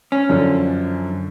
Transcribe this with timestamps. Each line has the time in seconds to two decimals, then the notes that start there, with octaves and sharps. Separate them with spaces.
0.12 C#4
0.30 F#2 D3 F3